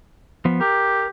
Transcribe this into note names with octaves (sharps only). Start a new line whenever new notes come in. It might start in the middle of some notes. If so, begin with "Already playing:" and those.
F3 B3
G4 A#4